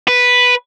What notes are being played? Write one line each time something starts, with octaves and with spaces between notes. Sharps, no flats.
B4